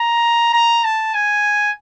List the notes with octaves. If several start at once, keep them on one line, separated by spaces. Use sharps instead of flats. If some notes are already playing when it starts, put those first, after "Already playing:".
Already playing: A#5
A#5
A5
G#5